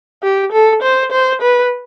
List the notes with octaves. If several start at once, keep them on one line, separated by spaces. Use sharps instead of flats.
G4
A4
C5
C5
B4